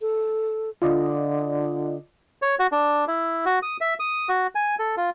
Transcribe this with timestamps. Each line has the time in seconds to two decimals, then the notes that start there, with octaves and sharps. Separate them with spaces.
0.01 A4
0.82 D3 F4 D5 D#5
2.42 C#5
2.59 F#4
2.72 D4
3.08 E4
3.45 F#4
3.62 D#6
3.81 E5
4.00 D#6
4.29 F#4
4.55 G#5
4.79 A4
4.97 F4